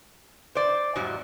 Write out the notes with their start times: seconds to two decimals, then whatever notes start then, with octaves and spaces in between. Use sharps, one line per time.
0.55 C5 D5
0.96 E2 G#2 F#3 G3